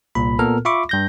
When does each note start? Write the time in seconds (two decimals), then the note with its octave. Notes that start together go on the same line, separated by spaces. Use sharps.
0.15 C2 A#2 B5
0.39 A#2 B3 A4 A#4 F6
0.65 F4 E5 B5 C#6 D6
0.89 G2 G6 A#6